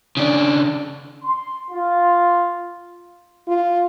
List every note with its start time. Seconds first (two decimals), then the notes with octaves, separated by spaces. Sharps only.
0.17 C#3 D4
1.23 C6
1.71 F4
3.48 F4